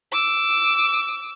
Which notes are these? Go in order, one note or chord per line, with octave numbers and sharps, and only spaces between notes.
D6 E6